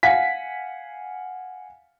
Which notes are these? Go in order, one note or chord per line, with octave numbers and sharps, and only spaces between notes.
F5 F#5 G#5 B6